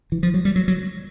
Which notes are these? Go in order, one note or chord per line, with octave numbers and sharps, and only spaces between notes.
E3
F3
F#3
G3
F#3
F#3